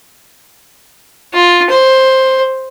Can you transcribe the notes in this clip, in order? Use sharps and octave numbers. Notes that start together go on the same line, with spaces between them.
F4
C5